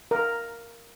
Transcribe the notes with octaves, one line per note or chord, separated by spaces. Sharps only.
A#4